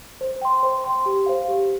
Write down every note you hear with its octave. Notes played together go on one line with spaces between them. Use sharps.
C5
G5 C6
C5
G5 C6
G4
C5 F5
G4